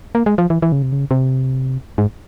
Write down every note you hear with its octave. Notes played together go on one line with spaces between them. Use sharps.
A#3
G#3
F3
E3
E3
C#3
C3
C#3
C3
G#2